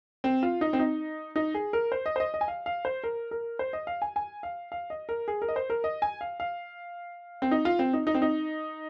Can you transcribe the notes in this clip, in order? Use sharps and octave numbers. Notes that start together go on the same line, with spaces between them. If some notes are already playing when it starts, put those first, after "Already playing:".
C4
F4
D#4
C4
D#4
D#4
G#4
A#4
C5
D#5
C5
D#5
D#5
G#5
F5
F5
C5
A#4
A#4
C5
D#5
F5
G#5
G#5
F5
F5
D#5
A#4
G#4
A#4
D#5
C5
A#4
D#5
G#5
F5
F5
C4
D#4
F4
C4
D#4
D#4
C4
D#4